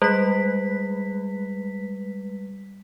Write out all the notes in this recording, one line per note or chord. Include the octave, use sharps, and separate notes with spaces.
G3 G#3 B4 F#6 B6